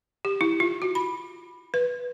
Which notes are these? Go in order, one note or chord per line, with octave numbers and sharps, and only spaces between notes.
G4
E4
F4
F#4
B5
B4